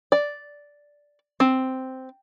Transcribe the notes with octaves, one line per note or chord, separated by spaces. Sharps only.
D5
C4